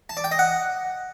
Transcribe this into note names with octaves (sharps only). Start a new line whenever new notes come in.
A5
D5
G5
D#5
F#5